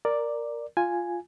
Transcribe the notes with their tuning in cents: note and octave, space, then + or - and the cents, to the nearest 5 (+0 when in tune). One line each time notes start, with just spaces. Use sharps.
A#4 +0 D5 +0
F4 +0 G#5 +0